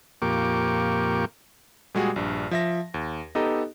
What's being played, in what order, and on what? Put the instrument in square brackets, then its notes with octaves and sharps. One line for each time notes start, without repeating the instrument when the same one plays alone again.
[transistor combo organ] F2 A#2 A#3 G4 C#6 D6
[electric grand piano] A#2 G3 G#3 F#4 G#4
A#1 G2
F3 E5 A#6
D#2
B3 D#4 G4 A4 D#5 A#5